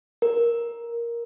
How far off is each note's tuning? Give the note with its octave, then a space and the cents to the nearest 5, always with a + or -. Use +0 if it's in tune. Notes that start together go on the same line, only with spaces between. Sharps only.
A#4 +10